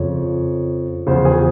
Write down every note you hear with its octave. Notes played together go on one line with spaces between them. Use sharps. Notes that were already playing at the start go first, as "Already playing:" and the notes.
Already playing: F2 C#3 F3 C#5
E2 C#3 F3 C5
G#4